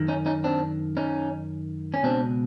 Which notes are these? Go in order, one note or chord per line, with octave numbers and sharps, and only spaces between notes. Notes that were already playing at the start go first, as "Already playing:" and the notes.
Already playing: F#2 D#3
C#4 D#4
C#4 D#4
C4 D4
C#4 D#4
C#4
C#2 B2 C4 D4